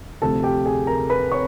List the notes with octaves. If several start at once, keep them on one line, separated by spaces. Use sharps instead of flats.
D2 C3 F3 A3 A4 A5
G4 G5
G#4 G#5
A#4 A#5
B4 B5
C#5 C#6